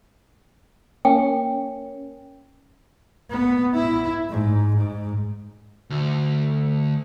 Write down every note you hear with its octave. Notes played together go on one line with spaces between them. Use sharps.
A#3 C#4 G5
B3
E4
G#2
G#2
D2